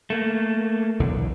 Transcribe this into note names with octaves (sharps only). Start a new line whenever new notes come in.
A3 A#3
B1 E2 D3